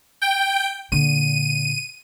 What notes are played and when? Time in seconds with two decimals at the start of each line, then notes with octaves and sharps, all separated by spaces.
0.22 G5
0.92 A#2 D3 D#7